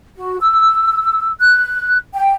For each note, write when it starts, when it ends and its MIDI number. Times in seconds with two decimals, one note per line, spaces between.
0.16 0.37 66
0.41 1.29 88
1.40 1.96 90
2.13 2.32 79